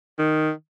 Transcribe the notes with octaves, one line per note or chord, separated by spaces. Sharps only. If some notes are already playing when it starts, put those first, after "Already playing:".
D#3